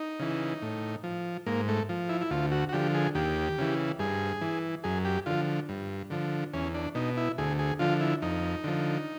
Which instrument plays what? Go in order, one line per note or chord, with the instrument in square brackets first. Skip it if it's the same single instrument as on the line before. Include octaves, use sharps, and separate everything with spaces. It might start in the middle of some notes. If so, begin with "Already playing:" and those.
Already playing: [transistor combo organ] D#4
C#3 E3
A2
F3
G#2 A#3
A3
F3
E4
E4
D2 F4
F#4
F#4
D3 F3 G4
G#4
D#2 G4
C#3 E3
G2 G#4
E3
F#2 G#4
G4
D3 F3 F4
G2
D3 F3
E2 C#4
D4
B2 D#4
E4
D2 G#4
G#4
D3 F3 F4
E4
F2 D#4
D3 F3